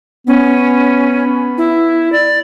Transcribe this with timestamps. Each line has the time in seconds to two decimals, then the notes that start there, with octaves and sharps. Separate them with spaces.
0.27 B3 C#4
1.58 E4
2.12 D5